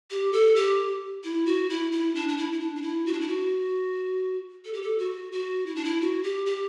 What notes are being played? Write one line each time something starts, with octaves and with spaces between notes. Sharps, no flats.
G4
A4
G4
E4
F#4
E4
E4
D4
D4
E4
E4
D4
D4
E4
F#4
D4
E4
F#4
A4
G4
A4
F#4
F#4
E4
D4
E4
F#4
G4
G4